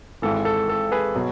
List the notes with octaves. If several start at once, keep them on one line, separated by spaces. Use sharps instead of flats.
G#1 G#2 E3 A4
A4
A4
G#4 B4
B2 F#3